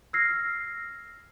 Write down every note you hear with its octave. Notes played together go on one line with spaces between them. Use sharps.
E6 F6 G#6 A#6 C7